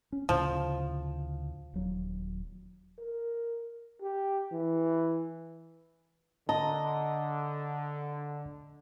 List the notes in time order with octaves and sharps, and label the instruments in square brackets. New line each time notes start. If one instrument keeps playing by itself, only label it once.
[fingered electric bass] C#4
[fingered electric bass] D2 A2 C#3 [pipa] F3
[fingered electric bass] D#1 F#3
[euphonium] A#4
[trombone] G4
E3
[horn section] D3 [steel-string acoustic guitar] D#5 [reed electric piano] A5 A#5